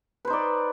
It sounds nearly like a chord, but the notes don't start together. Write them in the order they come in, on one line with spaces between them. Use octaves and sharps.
B4 C5 D#4 D5